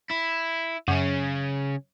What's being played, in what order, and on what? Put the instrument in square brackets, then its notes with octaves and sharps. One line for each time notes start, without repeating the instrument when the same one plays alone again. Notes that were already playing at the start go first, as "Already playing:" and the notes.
[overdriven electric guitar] E4
[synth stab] F#2 [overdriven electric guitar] C#3 C#4